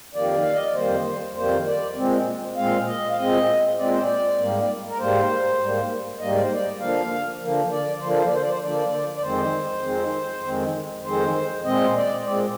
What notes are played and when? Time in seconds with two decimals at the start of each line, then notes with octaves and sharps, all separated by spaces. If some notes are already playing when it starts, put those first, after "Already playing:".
0.15 F2 D#3 G3 A#3 D5
0.41 F5
0.53 D#5
0.64 D5
0.75 F2 D#3 G3 A#3 C5
1.35 F2 D#3 G3 A#3 C5
1.66 D5
1.96 A#2 G#3 C4
2.56 A#2 G#3 C4 F5
2.86 D#5
3.10 F5
3.17 A#2 G#3 C4 D#5
3.77 A#2 G#3 C4 D5
3.90 C5
4.02 D5
4.38 G#2 G3 A#3
4.88 A#4
4.99 G#2 G3 A#3 C5
5.59 G#2 G3 A#3
6.19 G#2 G3 A#3 D#5
6.31 D5
6.41 C5
6.53 D5
6.80 D3 F3 A#3 F5
7.41 D3 F3 A#3
7.71 D5
8.01 D3 F3 A#3 C5
8.10 D5
8.17 C5
8.26 D5
8.34 C5
8.42 D5
8.50 C5
8.62 D3 F3 A#3 D5
9.16 D5
9.22 F2 D#3 G#3 C4 C5
9.82 F2 D#3 G#3 C4
10.43 F2 D#3 G#3 C4
11.03 F2 D#3 G#3 C4 C5
11.64 A#2 G#3 C4 D#5
11.84 C5
11.95 D5
12.25 A#2 G#3 C4 D5